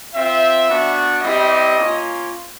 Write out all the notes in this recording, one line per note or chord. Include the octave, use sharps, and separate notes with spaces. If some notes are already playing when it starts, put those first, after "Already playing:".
C4 F4 E5
B3 D4 F#4
G3 C4 E4 G4 D#5
A#3 C#4 F4